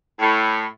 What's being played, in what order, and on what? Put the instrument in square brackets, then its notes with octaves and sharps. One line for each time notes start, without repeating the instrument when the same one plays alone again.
[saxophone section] A2